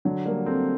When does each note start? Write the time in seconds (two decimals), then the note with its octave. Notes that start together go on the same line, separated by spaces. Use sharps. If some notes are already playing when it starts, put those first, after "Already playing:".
0.05 D3 F#3
0.26 G3 A#3
0.46 A3 C4